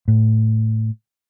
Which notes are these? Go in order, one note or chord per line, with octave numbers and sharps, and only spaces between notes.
A2